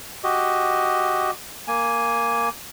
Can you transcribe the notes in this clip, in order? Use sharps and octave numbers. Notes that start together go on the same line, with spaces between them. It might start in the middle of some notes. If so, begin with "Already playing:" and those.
F#4 G4 D#5
A#3 G#5